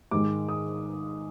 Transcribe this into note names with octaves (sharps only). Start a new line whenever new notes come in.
G#2 D#3 G#3 D6
D#6